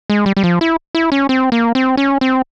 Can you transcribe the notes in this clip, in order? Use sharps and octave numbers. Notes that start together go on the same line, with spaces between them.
G#3
G3
G3
F3
E4
E4
C#4
C4
A#3
C4
C#4
C4